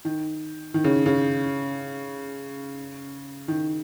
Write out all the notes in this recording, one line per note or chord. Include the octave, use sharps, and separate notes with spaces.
D#3
D#3
C#3
C#3
D#3